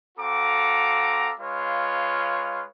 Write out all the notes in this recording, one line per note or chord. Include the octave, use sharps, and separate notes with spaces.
C4 F#4 A4 F5 A#5 D6
G#3 F4 B4 C#5 F5